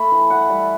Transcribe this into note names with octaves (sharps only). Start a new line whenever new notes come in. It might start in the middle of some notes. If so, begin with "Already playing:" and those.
Already playing: A3 B5
E3
F#5
G3